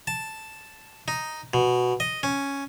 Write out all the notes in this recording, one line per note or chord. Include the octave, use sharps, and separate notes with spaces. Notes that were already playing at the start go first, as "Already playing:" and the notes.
A5
D#4
B2
D#5
C#4